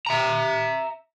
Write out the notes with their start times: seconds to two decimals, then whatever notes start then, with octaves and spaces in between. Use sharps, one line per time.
0.06 E5 A#5